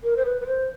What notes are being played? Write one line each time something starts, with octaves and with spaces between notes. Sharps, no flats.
A#4
C5
B4
B4
C5